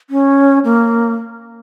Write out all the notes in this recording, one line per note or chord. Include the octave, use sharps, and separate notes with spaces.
C#4
A#3